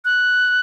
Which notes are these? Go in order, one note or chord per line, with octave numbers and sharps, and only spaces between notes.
F#6